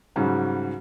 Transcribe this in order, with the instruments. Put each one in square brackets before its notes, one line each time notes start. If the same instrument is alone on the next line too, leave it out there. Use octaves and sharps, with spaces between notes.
[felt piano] G#2 C#3 F#3 G3